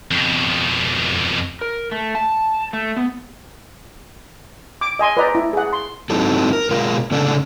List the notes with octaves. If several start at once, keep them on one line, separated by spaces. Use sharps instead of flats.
F2 B2
A#4
A3
A5
A3
B3
D6
D#5 G#5 C6
B4 C5 D5 D#5 A#5
E4
G#4 F#5
C6
G#2 F#3 C4 D#4 E4 A4
A#4
B2 G#3 F4 A#4
A2 C#3 C#4 D4 A4